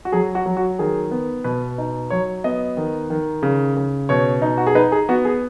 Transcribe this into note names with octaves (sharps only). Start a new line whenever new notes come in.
F#4
F#3 G#4
F#4
F#3
F#4
D#3 G#4
B3
B2 B4
D#4
F#3 C#5
B3 D#5
D#3
D#3
C#3
C#3
B2 C#5
D#4
F#4
G#4
D#4 B4
G#4
B3 F#4
G#4